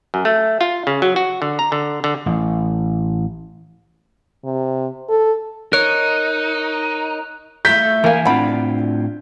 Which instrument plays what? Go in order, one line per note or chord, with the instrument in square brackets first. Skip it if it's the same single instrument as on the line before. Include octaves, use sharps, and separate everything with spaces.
[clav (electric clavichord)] F#2
A3
F4
C#3
F#3
F#4
D3
A#5
D3
D3
[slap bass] A1
[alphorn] C3
A4
[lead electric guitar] D#4 [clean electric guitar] A#4 C#5 [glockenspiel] F#6
[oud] A3 E4 F4 [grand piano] G6 B6
[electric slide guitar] E3 A#3 G#5 [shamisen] A#4 F5
[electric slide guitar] A2 C4 F4 [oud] D4 [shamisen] F#5 B5